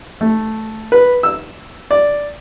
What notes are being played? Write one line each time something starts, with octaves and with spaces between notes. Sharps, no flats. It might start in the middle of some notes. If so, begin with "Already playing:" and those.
A3
B4
E6
D5